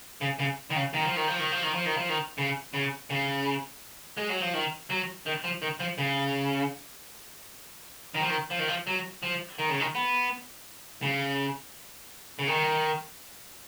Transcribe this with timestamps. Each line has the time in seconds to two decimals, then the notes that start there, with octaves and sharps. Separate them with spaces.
0.21 C#3
0.39 C#3
0.70 D#3
0.76 C#3
0.94 D#3
1.04 F3
1.16 D#3
1.28 F3
1.39 D#3
1.51 F3
1.63 D#3
1.74 F3
1.85 D#3
1.97 F3
2.09 D#3
2.38 C#3
2.74 C#3
3.10 C#3
4.17 G#3
4.29 F#3
4.41 F3
4.54 D#3
4.90 F#3
5.26 D#3
5.44 F3
5.62 D#3
5.80 F3
5.98 C#3
8.14 D#3
8.21 F3
8.29 D#3
8.50 F3
8.59 D#3
8.68 F3
8.87 F#3
9.23 F3
9.58 D#3
9.69 C#3
9.80 D#3
9.95 B3
11.02 C#3
12.39 C#3
12.47 D#3